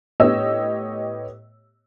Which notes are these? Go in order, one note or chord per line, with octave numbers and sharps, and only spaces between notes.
A2 B3 G4 C#5 D#5 E6